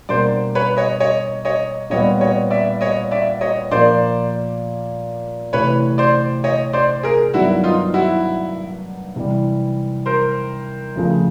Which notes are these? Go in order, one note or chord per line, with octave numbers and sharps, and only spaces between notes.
B2 G3 A#3 D4 C5 D5
B4 C#5
C#5 D#5
C#5 D#5
C#5 D#5
A#2 G3 B3 C#5 D#5
C#5 D#5
D5 E5
C#5 D#5
D5 E5
C#5 D#5
A#2 F3 A#3 C5 D5
C3 E3 A3 B4 C#5
C5 D5
C#5 D#5
C5 D5
G#4 A#4
G2 D#3 F#3 B3 D4 E4 F#4
D#4 F4
E4 F#4
C3 E3 G3
A#4 C5
F2 C#3 F3 A3